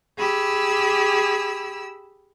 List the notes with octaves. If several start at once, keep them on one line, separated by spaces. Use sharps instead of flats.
G4 G#4 B5 E6